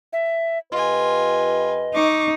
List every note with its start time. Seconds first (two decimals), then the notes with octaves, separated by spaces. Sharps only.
0.13 E5
0.72 F2 F4 G4 B4 D#5 G#5
1.94 D#4 C#6 D6